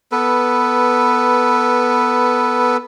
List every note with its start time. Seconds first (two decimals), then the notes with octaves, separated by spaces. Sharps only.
0.12 B3 A4 B4